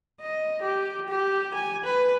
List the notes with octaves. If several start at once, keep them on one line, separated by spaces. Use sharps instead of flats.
D#5
G4
G4
G#5
B4